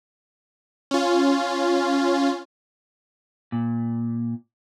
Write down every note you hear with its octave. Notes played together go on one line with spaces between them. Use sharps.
C#4 F4
A#2